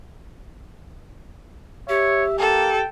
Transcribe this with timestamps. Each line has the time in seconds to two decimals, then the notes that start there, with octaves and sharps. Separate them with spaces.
1.89 G4 C#5 E5
2.39 A#3 A4 G5